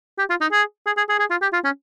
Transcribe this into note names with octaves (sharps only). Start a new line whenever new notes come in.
G4
F4
D#4
G#4
G#4
G#4
G#4
G#4
F4
G4
F4
C#4